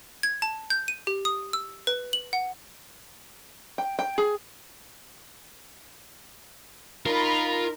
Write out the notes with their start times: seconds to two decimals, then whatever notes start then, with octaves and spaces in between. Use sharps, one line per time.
0.23 G#6
0.42 A5
0.70 G6
0.88 D#7
1.07 G4
1.25 D#6
1.53 E6
1.87 B4
2.13 F#7
2.33 F#5
3.78 G5
3.99 G5
4.18 G#4
7.06 D#4 F4 A#4 B5